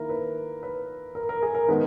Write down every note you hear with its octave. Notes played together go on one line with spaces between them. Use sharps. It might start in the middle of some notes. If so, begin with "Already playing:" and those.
Already playing: D#3 A#3 E4 A#4
B4
B4
A#4
A#4
G#4
A#4
D#3 G#3 B3 D#4 B4